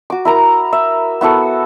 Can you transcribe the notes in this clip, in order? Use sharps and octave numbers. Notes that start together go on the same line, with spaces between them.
F#4 D6
E4 A#4 A#5
E5
B3 E4 F#4 A4